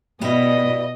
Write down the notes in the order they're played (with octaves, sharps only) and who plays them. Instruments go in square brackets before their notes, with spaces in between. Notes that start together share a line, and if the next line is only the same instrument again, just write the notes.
[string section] B2 [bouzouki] G3 E4 [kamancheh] D#5